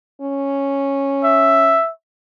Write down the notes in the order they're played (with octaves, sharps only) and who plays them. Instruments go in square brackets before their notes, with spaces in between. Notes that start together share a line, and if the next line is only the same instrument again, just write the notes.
[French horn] C#4
[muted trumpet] E5